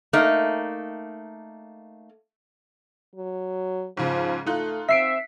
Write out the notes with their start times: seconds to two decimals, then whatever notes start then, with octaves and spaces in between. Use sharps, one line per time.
0.13 A3 A#3 D#4
3.16 F#3
3.97 G#2 C#3 F3
4.46 A3 D#4 F4 F#6
4.88 C4 E5 B6 C7 D7